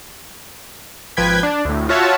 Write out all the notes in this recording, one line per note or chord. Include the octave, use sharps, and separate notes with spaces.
G#1 F3 B4 G5 G#6 B6
D4
D2 A2
F4 F#4 C#5 E5 A5